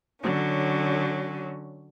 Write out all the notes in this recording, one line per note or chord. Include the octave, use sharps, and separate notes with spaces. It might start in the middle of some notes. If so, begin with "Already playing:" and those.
D3 F#3 C#4